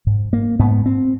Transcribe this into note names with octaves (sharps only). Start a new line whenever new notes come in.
G#2
A#3
G#2 B3
C4